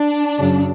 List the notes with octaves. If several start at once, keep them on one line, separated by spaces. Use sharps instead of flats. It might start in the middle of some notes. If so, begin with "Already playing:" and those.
Already playing: D4
F#2 C#3 F#3